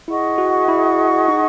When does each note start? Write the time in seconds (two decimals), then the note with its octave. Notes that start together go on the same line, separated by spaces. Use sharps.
0.08 E4 G#4 D#5 F#5 C#6
0.38 F#4
0.68 E4
1.28 D#4